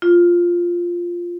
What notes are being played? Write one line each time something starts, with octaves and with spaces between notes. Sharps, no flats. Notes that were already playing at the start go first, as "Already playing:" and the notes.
F4